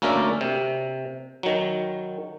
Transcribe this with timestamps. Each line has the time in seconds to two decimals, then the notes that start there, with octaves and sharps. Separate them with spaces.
0.02 D2 A#3 C#4 A#4 D5 E5
0.41 C3
1.43 D#3 F#3